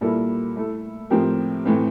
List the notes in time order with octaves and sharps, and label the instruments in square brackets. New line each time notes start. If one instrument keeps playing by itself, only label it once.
[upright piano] A#2 G3 A#3 E4 A4
A3 E4 A4
A2 F3 C4 G4 A#4
A2 E3 A3 C4